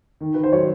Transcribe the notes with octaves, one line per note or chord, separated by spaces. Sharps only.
D#3
D#3 B4
C5
F#3 C#5